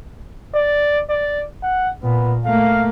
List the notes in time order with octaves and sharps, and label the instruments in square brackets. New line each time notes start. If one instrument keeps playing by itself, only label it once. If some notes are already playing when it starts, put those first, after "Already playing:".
[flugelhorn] D5
D5
F#5
[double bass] A#2 [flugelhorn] B3
[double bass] A3 A#3 [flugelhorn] F5